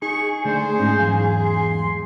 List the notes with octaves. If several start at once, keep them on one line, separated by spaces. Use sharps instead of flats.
D#4 G#4 C#6
D3 A3 C5 D5
G#2 C#4 D#4
E2 F#3 F5
C6